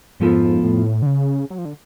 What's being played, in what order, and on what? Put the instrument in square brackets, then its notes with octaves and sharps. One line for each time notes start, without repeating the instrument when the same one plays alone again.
[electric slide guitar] F2 F3 B3 F4 A4 [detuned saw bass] G#2
[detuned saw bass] A2
D3
C#3
F#3
F3
D3